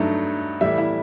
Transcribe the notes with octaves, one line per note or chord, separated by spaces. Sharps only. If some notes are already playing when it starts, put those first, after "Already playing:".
Already playing: G2 F#3 A3 D#4
A2 E3 G3 E4 E5
E4 E5